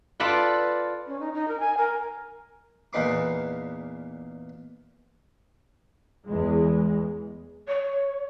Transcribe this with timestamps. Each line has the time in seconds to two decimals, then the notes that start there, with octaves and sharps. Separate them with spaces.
0.20 F4 A4 B4 D5 F#5
1.07 C#4
1.20 D#4
1.34 D#4
1.48 A#4
1.60 G#5
1.77 A#4
2.93 E2 A#2 D#4 B4 C6 D6
6.26 E2 G#3
7.67 C#5